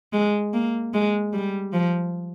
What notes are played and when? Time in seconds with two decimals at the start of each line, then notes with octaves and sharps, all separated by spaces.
0.13 G#3
0.54 A#3
0.93 G#3
1.33 G3
1.73 F3